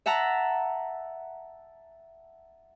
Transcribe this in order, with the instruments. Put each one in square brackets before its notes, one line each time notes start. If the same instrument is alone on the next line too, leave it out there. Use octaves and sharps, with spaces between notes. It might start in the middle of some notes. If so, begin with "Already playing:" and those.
[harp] E5 F#5 A5 A#5